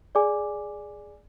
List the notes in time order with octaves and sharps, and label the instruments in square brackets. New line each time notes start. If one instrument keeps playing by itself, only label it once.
[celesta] G#4 D5 G#5 D6